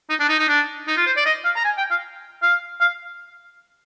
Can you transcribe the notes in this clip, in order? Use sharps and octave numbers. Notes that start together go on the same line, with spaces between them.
D#4
D4
D#4
D#4
D4
D#4
F4
C5
D5
D#5
F5
A#5
G#5
G5
F5
F5
F5